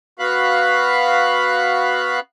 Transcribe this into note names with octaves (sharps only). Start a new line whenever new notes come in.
B3 F#4 F5 B5 F#6